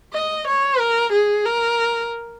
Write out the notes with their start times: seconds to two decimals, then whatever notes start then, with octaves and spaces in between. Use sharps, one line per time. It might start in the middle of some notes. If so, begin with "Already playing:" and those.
0.13 D#5
0.47 C#5
0.80 A#4
1.13 G#4
1.45 A#4